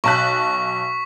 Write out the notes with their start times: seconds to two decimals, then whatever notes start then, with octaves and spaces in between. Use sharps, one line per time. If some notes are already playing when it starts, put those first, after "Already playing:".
0.04 B1 A5 C#6 F#6 B6